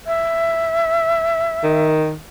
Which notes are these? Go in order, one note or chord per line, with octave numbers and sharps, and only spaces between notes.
E5
D#3